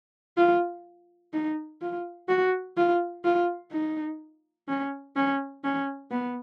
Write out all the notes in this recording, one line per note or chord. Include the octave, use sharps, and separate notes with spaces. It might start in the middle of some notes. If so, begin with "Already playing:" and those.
F4
D#4
F4
F#4
F4
F4
D#4
C#4
C#4
C#4
B3